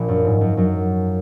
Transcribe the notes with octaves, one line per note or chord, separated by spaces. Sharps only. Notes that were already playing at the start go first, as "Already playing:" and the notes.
Already playing: A#1 A#2
F#2
G#2
F#2 F#3
F#2 F#3